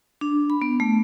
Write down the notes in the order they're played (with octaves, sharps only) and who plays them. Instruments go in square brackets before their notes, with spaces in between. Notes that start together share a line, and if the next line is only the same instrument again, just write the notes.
[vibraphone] D4
B5
B3
A3